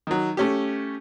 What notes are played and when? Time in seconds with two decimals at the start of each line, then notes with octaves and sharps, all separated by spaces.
0.07 D#3 F#3
0.37 A3 C#4 G4